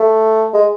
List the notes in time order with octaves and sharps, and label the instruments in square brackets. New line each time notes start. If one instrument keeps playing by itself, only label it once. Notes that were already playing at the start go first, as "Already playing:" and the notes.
Already playing: [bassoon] A3
G#3